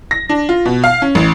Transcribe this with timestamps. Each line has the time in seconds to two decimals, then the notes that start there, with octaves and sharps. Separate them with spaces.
0.11 A#6
0.29 D4
0.49 F4
0.65 B2
0.84 F5
1.02 C#4
1.15 A1